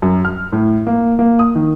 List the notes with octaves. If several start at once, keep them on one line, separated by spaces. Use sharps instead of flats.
F#2
F6
A2
A#3
A#3
D#6
D#3